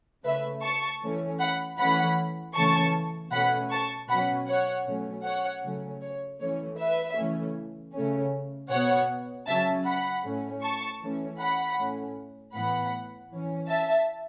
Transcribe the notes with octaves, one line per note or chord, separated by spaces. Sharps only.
C#3 A3 C#4 B4 E5
A5 C#6
E3 A3 C#4
F#5 B5
E3 A3 C#4 F#5 B5
C#3 E3 A3 C#4 A5 C#6
B2 A3 C#4 F#5 B5
A5 C#6
B2 F#3 C#4 F#5 B5
C#5 F#5
B2 F#3 A3 C#4
C#5 F#5
C#3 F#3 A3 C#4
C#5
E3 A3 C#4 C#5
B4 E5
C#3 E3 A3 C#4
C#3 A3 C#4
B2 B3 C#5 F#5
C#3 F#3 C#4 E5 A5
F#5 B5
A2 A3 C#4
A5 C#6
E3 A3 C#4
F#5 B5
A2 A3 C#4
A2 E3 B3 F#5 B5
E3 C#4
E5 A5